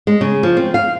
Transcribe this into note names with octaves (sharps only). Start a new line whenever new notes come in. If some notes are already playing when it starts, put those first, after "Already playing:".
G#3
C#3
F3
C4
F5